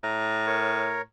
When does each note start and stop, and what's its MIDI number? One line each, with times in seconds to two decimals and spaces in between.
0.03 1.04 45
0.03 0.46 82
0.47 1.01 70
0.47 1.01 73